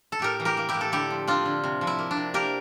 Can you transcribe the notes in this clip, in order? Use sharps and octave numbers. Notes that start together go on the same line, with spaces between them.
A4
A2 G4 A#4
E3
G4 A#4
A#3
E4 G4
A2
A4
D3 E4 G4
F3
C4 D4 F4
D3
C3
F3
E4
A#3
D4
C3
A#3 G4 A#4